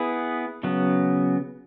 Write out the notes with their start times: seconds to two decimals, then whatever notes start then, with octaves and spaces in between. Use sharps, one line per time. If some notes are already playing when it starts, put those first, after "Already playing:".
Already playing: B3 E4 G#4 B4
0.63 C#3 F#3 B3